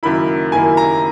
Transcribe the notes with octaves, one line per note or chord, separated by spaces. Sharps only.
F#1 F#2 D#3 A#3 E4 B5
F#1 F#2 D#3 A#3 E4 G#5
A#5